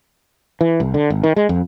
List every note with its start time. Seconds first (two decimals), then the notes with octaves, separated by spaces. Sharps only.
0.61 E3
0.80 C2
0.94 D3
1.10 G#1
1.23 D#3
1.36 G#3
1.49 F2